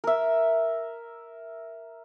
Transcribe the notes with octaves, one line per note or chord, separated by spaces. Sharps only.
A#4 E5